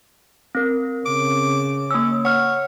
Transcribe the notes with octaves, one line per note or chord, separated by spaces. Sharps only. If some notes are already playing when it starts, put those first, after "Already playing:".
C4 A#4
C#3 D6
A#3 C#4 E6
C#5 F#5 F6